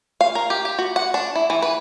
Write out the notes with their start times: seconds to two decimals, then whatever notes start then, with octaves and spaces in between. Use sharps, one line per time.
0.21 F5
0.35 A#4
0.50 G4
0.65 G4
0.79 F#4
0.96 F#5
1.14 D4
1.36 E4
1.50 E3
1.62 B4